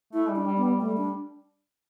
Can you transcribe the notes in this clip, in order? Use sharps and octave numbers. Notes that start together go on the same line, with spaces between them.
A3 E4
G3
D4
G3
B3
G3
G3 A3
D4